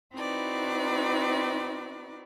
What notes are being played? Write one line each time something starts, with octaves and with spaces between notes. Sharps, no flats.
C4 D#4 E4 F#4 B4 D5